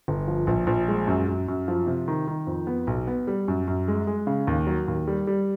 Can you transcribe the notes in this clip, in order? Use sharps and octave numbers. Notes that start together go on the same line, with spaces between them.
G1
F3
A#1
A#1
G#3
F#2
F#2
F#2
F3
C3
D#3
D#3
F2
B3
B1
B3
G3
F#2
F#2
G#3
G#3
C#3
D#2
F#3
D#2
G3
G3